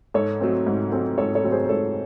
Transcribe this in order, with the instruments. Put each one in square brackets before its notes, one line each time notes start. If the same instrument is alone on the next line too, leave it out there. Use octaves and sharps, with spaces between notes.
[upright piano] G#2 A4 C#5
F#3 A3 C4
G#2
F#3 A3 C4
G#2 A4 C#5
A4 C#5
F#3 A3 C4
G#4 C5
C5
G#2 A4 C#5